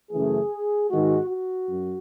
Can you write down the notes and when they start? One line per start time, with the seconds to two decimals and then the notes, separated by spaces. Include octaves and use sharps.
0.12 F#2 C#3 E3 A3 G#4
0.90 G#2 D#3 G#3 F#4
1.30 F#4
1.69 F#2